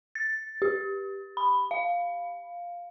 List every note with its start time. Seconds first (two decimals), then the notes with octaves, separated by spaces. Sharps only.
0.15 A6
0.62 G4
1.37 B5
1.71 F5